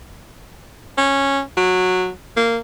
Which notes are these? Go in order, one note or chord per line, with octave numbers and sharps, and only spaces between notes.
C#4
F#3
A#3